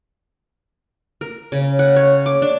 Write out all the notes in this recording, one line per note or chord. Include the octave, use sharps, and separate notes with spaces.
A#4
C#3
F#5
C#5
D6
D4